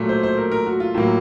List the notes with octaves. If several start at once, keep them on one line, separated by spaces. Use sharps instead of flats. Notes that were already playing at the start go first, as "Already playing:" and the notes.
Already playing: A#2 F#3 A3
C5
C5
A#4
A#4
F#4
F4
A2 F#3 A#3